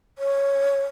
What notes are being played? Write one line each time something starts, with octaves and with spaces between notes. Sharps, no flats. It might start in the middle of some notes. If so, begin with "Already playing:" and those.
C#5